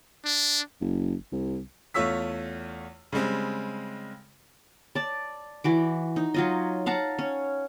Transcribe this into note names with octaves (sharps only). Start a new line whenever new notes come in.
D4
F#1
C2
E2 A3 F4 C#5 E6 B6
C#3 G3 G#3 C4
D5 A5
E3 F#4 D6
D#4
F#3 F4 D#5
F5 F#5 A5 A#5
C#4